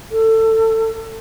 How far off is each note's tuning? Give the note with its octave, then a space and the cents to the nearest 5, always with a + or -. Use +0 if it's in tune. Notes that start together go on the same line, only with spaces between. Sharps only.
A4 +20